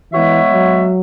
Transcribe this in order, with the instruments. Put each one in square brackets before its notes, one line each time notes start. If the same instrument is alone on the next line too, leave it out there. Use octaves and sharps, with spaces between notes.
[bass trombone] E3 [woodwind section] G#3 B3 F#4 C#5 E5
[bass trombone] F#3